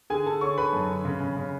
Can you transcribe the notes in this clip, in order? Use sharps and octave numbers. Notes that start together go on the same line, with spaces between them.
D3 G#4 G#5
D3 A4 A5
D3 C#5 C#6
D3 B4 B5
F#2
D3
C#3
C#3
C#3